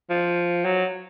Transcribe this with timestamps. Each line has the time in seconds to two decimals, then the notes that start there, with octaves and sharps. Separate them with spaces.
0.10 F3
0.65 F#3